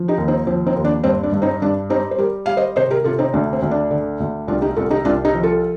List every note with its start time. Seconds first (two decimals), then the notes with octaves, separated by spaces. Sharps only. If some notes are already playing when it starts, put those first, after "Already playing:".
Already playing: F3
0.08 D#4 G4
0.18 D#2
0.28 C4 D#4
0.47 F3 C4
0.66 C4 D#4
0.76 D#2
0.84 D4
1.04 G2 C4
1.23 D4
1.32 G2
1.42 C4 D#4
1.62 G2 D4
1.90 G3 C4 D#4
2.11 C5
2.18 G3 G4 A#4
2.46 G3 F5
2.57 C5 D#5
2.76 C3 C5 D#5
2.90 G4 A#4
3.04 C3 F4 A4
3.19 C4 D#4
3.33 D2 D4
3.53 C4
3.62 D2
3.71 D4
3.91 D3
4.20 D2
4.48 C2 D4 F4
4.62 D#4 G4
4.76 C2 F4 A4
4.91 D#4 G4
5.05 C2 D4 F4
5.25 D#4 G4
5.34 F3
5.43 F4 A4